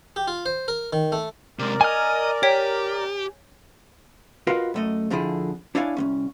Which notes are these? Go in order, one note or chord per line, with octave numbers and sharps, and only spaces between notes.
G4
F4
C5
A#4
D#3
A3
C3 G#3 A#4 D5
D#5 G#5 F6
G4 C#5 G5 B6
F4 F#4 A#4 B4 D#5 F5
F#2 A3 D#5
F2 D3 F3 E4 G#4
D4 E4 C#5 D5 F5 G#5
C2 F#3 C#4